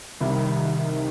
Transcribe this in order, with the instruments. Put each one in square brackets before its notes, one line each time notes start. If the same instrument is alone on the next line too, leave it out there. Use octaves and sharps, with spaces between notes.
[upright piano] C2 C3 G3 [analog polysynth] D#3